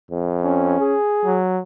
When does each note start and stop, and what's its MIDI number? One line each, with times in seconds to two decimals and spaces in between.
0.11 0.79 41
0.44 0.97 61
0.80 1.38 68
1.25 1.62 54